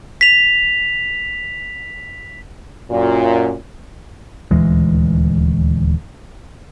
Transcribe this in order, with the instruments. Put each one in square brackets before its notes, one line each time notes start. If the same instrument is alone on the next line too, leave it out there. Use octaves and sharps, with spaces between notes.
[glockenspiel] B6 F7
[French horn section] F#2 A#2
[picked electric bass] D#1 D2 E3 G#3